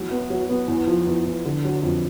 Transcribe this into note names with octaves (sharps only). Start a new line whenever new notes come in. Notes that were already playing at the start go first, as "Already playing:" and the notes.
Already playing: E2 F#3
B3
F#3
B3
E2
F3
E2
E2
D3
F#3
F2